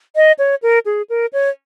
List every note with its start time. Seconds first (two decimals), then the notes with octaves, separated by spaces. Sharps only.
0.16 D#5
0.39 C#5
0.63 A#4
0.86 G#4
1.10 A#4
1.33 C#5